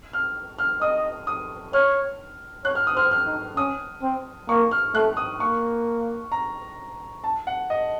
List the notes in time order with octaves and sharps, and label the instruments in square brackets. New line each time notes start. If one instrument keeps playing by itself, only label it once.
[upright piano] F6
F6
[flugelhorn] D#5 [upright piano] D#6
[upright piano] D#6
[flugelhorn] C#5 [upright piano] F6
[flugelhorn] C#5 [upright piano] F#6
[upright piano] F6
D#6
[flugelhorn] C5 [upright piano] F6
[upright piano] F6
[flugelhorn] D#4
[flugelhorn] C#4 [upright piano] D#6
[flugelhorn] C4
[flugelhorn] A#3 [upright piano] C#6
[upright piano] F6
[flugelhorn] A3 [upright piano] F#6
[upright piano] D#6
[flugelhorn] A#3 [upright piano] C#6
[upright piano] A#5
A5
F#5
D#5